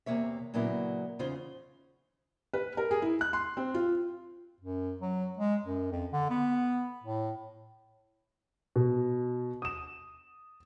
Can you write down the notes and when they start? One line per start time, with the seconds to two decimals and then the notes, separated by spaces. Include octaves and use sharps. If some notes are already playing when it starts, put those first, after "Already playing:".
0.06 E2 C3 A#3 C#5 E5
0.54 A#2 C#3 F#3 A#3 B3 E4
1.19 E2 C#3 D#4 F4 C5
2.53 B4
2.77 A#4
2.91 G#4
3.02 E4
3.21 F#6
3.33 C6
3.57 C4
3.74 F4
4.61 F#2
5.01 F#3
5.38 G#3
5.65 F#2
5.92 F2
6.13 D3
6.30 B3
7.04 A2
8.76 B2
9.62 D#6 E7